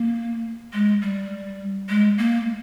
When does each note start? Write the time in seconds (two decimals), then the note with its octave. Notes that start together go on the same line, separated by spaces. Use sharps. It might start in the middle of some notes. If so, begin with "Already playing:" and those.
Already playing: A#3
0.73 G#3
1.02 G3
1.89 G#3
2.18 A#3